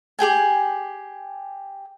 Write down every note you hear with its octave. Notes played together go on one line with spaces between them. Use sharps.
G4 G#4 G5 G#5